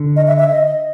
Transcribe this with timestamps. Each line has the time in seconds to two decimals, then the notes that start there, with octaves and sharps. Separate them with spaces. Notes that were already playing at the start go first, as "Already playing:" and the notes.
Already playing: D3
0.16 D#5
0.27 E5
0.39 E5
0.51 D#5